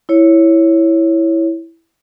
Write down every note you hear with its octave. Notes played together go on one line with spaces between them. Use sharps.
E4 C#5